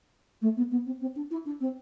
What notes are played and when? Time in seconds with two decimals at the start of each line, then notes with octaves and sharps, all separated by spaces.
0.42 A3
0.57 B3
0.71 B3
0.86 C4
1.01 C4
1.16 D4
1.31 E4
1.46 D4
1.61 C4